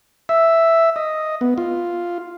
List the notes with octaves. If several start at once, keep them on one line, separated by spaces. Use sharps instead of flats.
E5
D#5
B3
F4